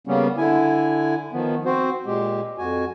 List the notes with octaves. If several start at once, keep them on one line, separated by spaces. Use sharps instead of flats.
C#3 G3 A#3 B3 C#4
D3 E4 G#5
D#3 F3 B3
C4 F#4 C5
A#2 G#3 G4
F2 F#4 G#5